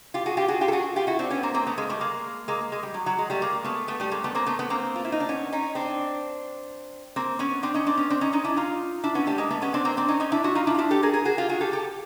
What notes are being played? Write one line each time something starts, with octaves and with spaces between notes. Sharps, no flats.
F4 G4
F#4 G#4
F4 G4
F#4 G#4
F4 G4
A4
F#4 G#4
F4 G4
E4 F#4
C4 D4
B3 C#4
A#3 C4
A#3 C4
A3 B3
G#3 A#3
G3 A3
G#3 A#3
G#3 A#3
G#3
G3
F#3
F#3
G#3
G3 A3
G#3 A#3
A3 B3
A3 B3
G3 A3
G#3 A#3
A3 B3
A#3 C4
A3 B3
A3 B3
A#3 C4
F4
E4
D#4
D4
B3 C#4
C#4 D#4
C4 D4
A#3 C4
B3 C#4
C4 D4
C#4 D#4
C4 D4
B3 C#4
C4 D4
C#4 D#4
C#4 D#4
D4 E4
D#4 F4
D4 E4
B3 C#4
G3 A3
G#3 A#3
A3 B3
B3 C#4
C4 D4
A#3 C4
C4 D4
C#4 D#4
C#4 D#4
D4 E4
E4 F#4
D#4 F4
D4 E4
F4
D4 E4
G4 A4
G#4 A#4
G#4 A#4
F#4 G#4
F4 G4
F#4 G#4
G4 A4
G4 A4